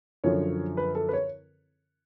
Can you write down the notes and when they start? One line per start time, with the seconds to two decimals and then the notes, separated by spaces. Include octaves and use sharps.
0.24 F#2 D3 F3 C#5
0.77 B4
0.95 A4
1.09 B4
1.13 C#5